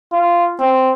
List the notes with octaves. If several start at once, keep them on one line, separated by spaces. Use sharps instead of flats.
F4
C4